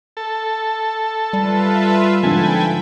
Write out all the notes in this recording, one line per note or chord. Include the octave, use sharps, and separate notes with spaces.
A4
G3 F4 B4 E5
G#2 D3 F3 A4 G5 G#5 B5